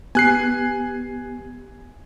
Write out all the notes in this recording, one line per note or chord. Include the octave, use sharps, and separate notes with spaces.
B3 G4 G#5 F#6 C7